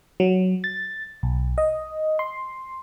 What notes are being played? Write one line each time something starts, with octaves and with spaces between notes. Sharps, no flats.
F#3
A6
B1
D#5
C6